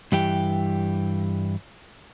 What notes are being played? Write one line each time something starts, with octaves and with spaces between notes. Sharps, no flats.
G2 E3 G4